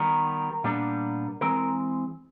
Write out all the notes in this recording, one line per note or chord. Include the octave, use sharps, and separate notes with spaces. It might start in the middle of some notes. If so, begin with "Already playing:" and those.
Already playing: D#3 G3 B3 A#4
A#2 G3 B3 D4
E3 G#3 C4 A#4